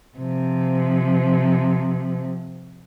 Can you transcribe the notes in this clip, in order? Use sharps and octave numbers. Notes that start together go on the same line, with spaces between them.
C3 F3